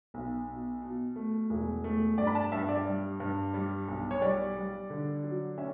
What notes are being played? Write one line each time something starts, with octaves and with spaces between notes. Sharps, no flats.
B1
B2
B2
A3
E1
A3
G2 D5
B5
A5
G2 E5
D5
G3
G2
G3
B1
C#5
G3 D5
G3
D3
F#3
C#4 E5